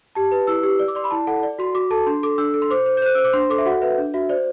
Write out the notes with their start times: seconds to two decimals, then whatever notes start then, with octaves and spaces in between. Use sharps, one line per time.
0.15 G4 A5
0.31 B4
0.47 E4 E6
0.63 G4
0.79 D5
0.88 D6
0.95 D5 C6
1.04 B5
1.11 E4 A5
1.27 A4 F#5
1.43 D5
1.59 F#4 C6
1.75 F#4 D6
1.91 A4 A5
2.07 D4 C6
2.23 A4 D6
2.38 D4 E6
2.54 A4
2.62 C6
2.71 C5 D6
2.86 C5
2.97 G6
3.02 C5 F#6
3.15 C5 E6
3.24 D6
3.33 D4 C6
3.50 A4 D6
3.58 E5
3.66 F#4 F#5
3.82 B4 E5
3.98 D4
4.14 F#4 E5
4.29 C5 D5